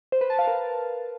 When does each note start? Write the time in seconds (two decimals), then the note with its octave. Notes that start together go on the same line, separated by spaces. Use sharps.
0.12 C5
0.21 B4
0.30 A5
0.39 F5
0.47 A#4